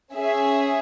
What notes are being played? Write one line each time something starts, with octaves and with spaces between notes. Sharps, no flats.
C#4 G#4 E5